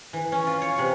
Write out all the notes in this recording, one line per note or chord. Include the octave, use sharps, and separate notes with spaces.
E3
C#4
F4
C#5
C3